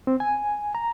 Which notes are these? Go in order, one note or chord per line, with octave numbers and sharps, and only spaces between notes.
C4
G#5
A#5